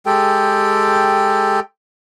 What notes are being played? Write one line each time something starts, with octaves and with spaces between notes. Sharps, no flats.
G#3 G4 A4 G5